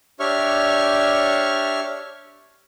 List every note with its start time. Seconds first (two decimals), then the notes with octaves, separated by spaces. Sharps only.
0.20 D4 G4 C#5 E5 C#6 F6